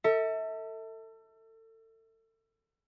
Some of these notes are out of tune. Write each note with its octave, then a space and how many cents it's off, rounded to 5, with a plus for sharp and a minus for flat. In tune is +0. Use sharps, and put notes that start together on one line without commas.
A4 +30 E5 -30